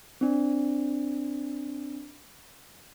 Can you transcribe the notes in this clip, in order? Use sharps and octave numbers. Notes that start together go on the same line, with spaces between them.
C4 D4